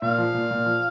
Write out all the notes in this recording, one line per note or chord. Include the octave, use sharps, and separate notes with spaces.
A#2 F5
F3
A#2
A#2
F3